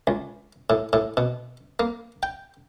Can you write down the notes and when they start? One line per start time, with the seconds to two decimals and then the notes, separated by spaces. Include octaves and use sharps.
0.07 C#2
0.70 A2
0.93 A2
1.17 B2
1.80 A#3
2.23 G5